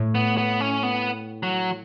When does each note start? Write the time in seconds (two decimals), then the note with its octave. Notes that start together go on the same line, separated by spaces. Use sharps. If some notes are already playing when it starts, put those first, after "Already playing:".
Already playing: A2
0.15 B3
0.38 B3
0.60 C#4
0.83 B3
1.43 F#3